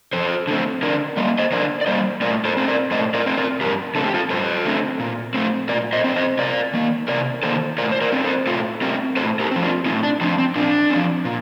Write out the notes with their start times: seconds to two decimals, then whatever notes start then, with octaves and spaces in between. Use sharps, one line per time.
0.13 F2 A4 C5
0.47 D3 A3 C4
0.83 D3 A#4 D5
1.17 G3 A#3 D#5
1.39 C5 D#5
1.52 D3 A#4 D5
1.81 D5
1.87 G3 A#3 C5 D#5
2.21 A2 A#4 D5
2.45 A4 C5
2.57 A3 C4
2.68 A#4 D5
2.91 A2 C5 D#5
3.14 A#4 D5
3.26 A3 C4
3.37 A#4 D5
3.60 G2 G4 A#4
3.95 D3 A3 C4 A4
4.05 G4
4.14 F4 A4
4.30 G2 A4 C5
4.65 D3 A3 C4
5.00 A#2
5.34 A3 C4
5.69 A#2 A#4 D5
5.93 C5 D#5
6.04 A3 C4
6.16 C5 D#5
6.38 C3 A#4 D5
6.73 D#3 A#3
7.08 C3 A#4 D5
7.43 D#3 A#3 A4 C5
7.78 A2 A#4 D5
7.92 C5
8.01 A#4 D5
8.12 A3 C4
8.24 A4 C5
8.47 A2 F4 A4
8.82 A3 C4 G4 A#4
9.17 A2 A4 C5
9.39 G4 A#4
9.51 F3 C4
9.63 D4 F4
9.86 A2 C4 D#4
10.03 D4
10.21 F3 D4
10.24 C4
10.39 C4
10.55 A#2 D4
10.90 F3 C4
11.25 A#2